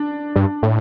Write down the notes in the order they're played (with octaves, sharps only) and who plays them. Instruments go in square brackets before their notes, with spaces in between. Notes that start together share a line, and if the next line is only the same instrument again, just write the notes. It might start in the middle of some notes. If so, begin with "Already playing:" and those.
Already playing: [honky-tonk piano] D4
[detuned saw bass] G2
A2